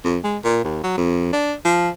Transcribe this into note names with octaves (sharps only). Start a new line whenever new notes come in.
F2
G#3
A#2
D#2
F#3
F2
D4
F3